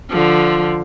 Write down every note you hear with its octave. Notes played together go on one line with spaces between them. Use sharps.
D3 F3